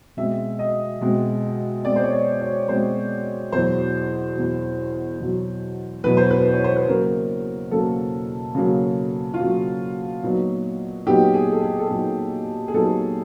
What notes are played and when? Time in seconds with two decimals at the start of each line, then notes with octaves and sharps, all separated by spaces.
0.17 B2 G#3 C4 E5
0.59 D#5
1.01 B2 G#3 C4
1.85 B2 G#3 C4 D5
1.96 C5
2.04 C#5
2.13 D5
2.41 C#5
2.68 B2 G#3 C4 C5
3.52 E2 B2 F#3 C5
4.36 E2 B2 F#3
5.20 E2 B2 F#3
6.04 E2 B2 F#3 B4
6.17 C5
6.30 B4
6.53 C#5
6.64 C5
6.76 B4
6.88 C#3 F#3 A#3 A#4
7.71 C#3 F#3 A#3 A4
8.55 C#3 F#3 A#3
9.34 F4
9.39 C#3 F#3 A#3 F#4
10.23 A#2 F#3 B3 D#4
11.06 A#2 F#3 B3 D#4 G4
11.34 G#4
11.52 A4
11.62 G#4
11.79 A4
11.90 A#2 F#3 B3 D#4 G#4
12.68 G#4
12.74 A#2 F#3 B3 D#4 A4